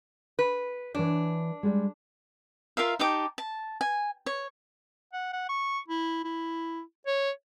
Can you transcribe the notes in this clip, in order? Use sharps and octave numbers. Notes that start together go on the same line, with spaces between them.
B4
E3 D4 B4 C#5
G3 G#3
F4 A#4 E5 F5
D#4 G4 A5 D6
A5
G#5
C#5
F#5
F#5
C#6
E4
E4
C#5